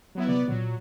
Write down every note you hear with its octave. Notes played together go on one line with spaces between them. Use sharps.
F#3 B3 E4
C3 B3 D5
A#2 F#3